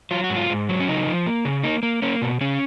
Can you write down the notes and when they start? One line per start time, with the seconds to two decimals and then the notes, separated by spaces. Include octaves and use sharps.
0.11 F#3 F4
0.24 F#4
0.30 G#2
0.36 F4
0.50 G#2
0.69 F#3
0.80 C#4
0.88 C#3 D#4
1.07 F3
1.26 A#3
1.45 C#3
1.64 A#3 D#4
1.83 A#3
2.02 A#3 C#4
2.22 B2
2.41 C#3 C#4